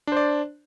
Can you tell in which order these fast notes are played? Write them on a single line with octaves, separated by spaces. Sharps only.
D4 C5 D5